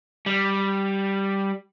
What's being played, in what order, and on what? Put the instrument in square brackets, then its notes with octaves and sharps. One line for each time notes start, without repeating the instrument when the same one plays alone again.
[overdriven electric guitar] G3